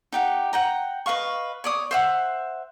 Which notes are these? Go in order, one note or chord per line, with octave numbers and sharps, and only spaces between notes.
D#4 G4 F#5
F#5 G5 A#5
B4 D#5 F5 C#6
C#5 D5 D#6
C5 E5 F#5